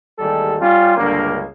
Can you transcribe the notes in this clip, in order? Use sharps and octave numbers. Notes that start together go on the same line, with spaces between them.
A1 D#2 G3 G#3 A4
G3 C#4 F4
C#2 G2 D3 A#3